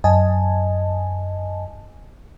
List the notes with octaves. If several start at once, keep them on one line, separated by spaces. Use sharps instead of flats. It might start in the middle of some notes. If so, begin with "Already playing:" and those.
F#2 D#5 G#5 A5